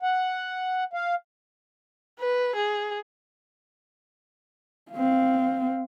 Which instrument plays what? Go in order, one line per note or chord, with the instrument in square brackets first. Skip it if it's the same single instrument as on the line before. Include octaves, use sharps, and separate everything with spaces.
[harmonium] F#5
F5
[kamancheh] B4
G#4
[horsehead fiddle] C4 F5